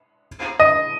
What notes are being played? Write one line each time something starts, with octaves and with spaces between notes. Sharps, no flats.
D#5